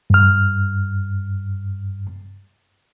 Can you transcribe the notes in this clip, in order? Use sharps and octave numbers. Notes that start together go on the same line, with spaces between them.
G2 F6